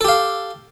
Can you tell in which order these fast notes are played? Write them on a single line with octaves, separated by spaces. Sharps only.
A4 G4 F5